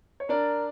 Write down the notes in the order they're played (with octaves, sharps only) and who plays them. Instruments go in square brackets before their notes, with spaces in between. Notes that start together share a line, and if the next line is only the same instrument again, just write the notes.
[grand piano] C#5
[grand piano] D4 D5 [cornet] A#4